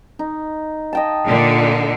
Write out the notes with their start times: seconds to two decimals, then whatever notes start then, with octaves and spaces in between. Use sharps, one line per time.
0.19 D#4
0.93 D#5 G5 A5
1.27 A#2 D3